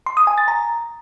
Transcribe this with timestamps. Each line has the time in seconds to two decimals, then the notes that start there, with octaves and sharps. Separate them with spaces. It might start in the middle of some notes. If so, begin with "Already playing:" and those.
0.06 C6
0.17 D#6
0.27 G#5
0.38 A6
0.48 A#5